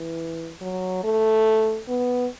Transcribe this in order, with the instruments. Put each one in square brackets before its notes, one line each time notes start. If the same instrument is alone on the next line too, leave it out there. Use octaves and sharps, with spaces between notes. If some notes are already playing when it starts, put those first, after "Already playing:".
Already playing: [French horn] E3
F#3
A3
B3